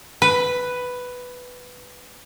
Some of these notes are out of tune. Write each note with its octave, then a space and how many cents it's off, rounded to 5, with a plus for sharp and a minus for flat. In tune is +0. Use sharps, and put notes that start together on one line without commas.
B4 +5